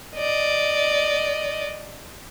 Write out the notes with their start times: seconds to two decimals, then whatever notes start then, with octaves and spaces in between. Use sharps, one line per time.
0.16 D5 D#5